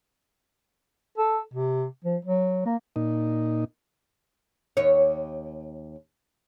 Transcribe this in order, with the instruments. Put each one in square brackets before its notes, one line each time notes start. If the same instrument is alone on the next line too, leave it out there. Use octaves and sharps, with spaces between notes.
[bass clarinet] A4
C3
F3
F#3
A#3
[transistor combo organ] A#2 D#4
[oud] D#2 C#5